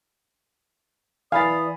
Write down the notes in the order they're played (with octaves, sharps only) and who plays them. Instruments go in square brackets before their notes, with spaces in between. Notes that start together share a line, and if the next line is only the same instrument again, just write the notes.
[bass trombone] E3 [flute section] D5 D#6 [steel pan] F5 [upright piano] G#5 B5 A6